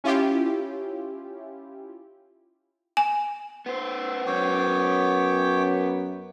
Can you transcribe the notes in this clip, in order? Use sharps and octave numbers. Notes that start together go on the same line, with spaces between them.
C#4 E4 F4 G4
G#5
B3 C5
F#2 C#5 G5 D6